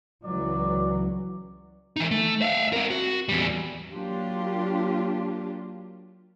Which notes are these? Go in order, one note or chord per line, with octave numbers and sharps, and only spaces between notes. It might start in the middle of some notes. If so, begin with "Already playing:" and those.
C#2 E3 F#3 D5
E3 D#4
A3
E5 F5
C4 A#4
F#4
E2 G3
F#3 A#3 D4 F4 G4